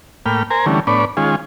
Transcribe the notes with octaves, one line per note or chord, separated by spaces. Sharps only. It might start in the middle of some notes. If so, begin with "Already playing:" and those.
A2 A#3 G5 B5 F6
A#4 C5 G#5 A#5
D3 E3 G3 A3 C#4
A2 B3 D4 C#5 D5 B5
D#3 G#3 C#4 F4 G#4